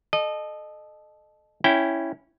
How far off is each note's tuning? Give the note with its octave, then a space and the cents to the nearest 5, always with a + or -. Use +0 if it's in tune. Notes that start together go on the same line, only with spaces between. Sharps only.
A4 -25 D#5 -25
C#4 +0 E4 +0 G5 +0